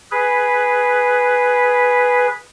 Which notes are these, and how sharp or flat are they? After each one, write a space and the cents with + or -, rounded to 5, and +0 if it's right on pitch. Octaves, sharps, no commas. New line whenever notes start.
G#4 +0 B4 +0